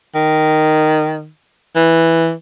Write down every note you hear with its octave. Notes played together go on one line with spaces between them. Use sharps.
D#3
E3